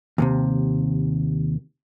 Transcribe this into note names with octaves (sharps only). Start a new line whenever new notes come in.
D#2 A2 C3